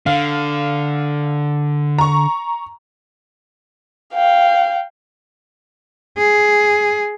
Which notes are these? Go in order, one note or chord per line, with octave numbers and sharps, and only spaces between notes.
D3 F5
A#5 C#6
F5 G5
G#4